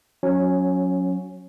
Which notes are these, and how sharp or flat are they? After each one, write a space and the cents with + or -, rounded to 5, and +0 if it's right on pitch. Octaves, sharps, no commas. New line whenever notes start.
F#3 -25 C#4 +0